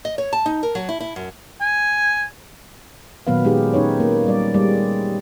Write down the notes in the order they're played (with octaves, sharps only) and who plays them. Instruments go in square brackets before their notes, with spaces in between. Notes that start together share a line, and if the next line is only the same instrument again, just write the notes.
[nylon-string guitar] D#5
C#5
A5
D#4
A#4
F#3
E4
E4
F#2
[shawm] G#5
[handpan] A#2 D#3 F#3 B3 B4 F5
G#3 D#4 G4 G#4
C#4 D#4 B4 C#5
A#3
G3 D5
G3 G#3 D5